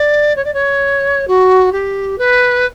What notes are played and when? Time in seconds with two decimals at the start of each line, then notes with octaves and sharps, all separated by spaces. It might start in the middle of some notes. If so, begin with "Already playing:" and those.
Already playing: D5
0.36 C#5
0.44 D5
0.54 C#5
1.28 F#4
1.72 G4
2.18 B4